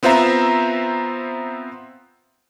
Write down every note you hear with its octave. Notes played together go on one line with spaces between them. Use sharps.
B3 C4 F4 C5 E5 A#5